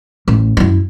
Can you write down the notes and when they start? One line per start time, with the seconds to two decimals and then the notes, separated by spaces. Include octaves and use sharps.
0.28 A1
0.57 F#2 E4